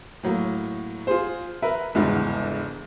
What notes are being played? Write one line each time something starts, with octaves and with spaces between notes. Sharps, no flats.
A2 F#3 A#3
F4 G#4 C5
A#4 B4 E5
G1 E2 G#2 C#3